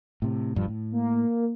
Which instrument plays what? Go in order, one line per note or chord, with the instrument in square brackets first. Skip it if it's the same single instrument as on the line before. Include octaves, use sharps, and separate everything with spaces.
[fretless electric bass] A2 C3
E1 G2 F3
A2
[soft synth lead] A#3